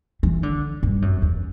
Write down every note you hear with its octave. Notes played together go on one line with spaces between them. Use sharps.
E3
D3
G2
F#2
E2